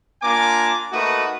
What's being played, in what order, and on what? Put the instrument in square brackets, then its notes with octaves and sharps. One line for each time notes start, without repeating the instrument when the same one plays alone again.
[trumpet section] A#3 D4 F4 G#5 A#5 D6
A3 A#3 D#4 F#4 B4 D#6